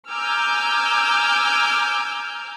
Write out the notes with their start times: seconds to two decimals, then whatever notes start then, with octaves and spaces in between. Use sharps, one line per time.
0.10 G#5 A#5 D6 E6 F6 G6